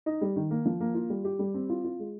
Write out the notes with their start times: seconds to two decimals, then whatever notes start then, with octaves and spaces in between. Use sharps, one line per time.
0.06 D#4
0.21 G3
0.36 D#3
0.51 A#3
0.65 F3
0.80 A#3
0.95 F4
1.10 G3
1.24 G4
1.39 G3
1.54 C4
1.70 F4
1.85 F4
1.99 G#3